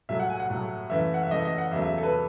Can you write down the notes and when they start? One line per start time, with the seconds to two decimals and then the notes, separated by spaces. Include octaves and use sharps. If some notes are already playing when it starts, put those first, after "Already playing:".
0.09 A2 F#3 A3 E5
0.20 F#5
0.30 G#5
0.40 F#5
0.50 A2 F#3 A3
0.90 F#2 E3 A3 E5
1.14 F#5
1.23 E5
1.31 F#2 E3 A3 D#5
1.45 D#5
1.58 F#5
1.71 E2 C#3 F#3 A3 E5
1.82 E5
1.98 A4
2.03 B4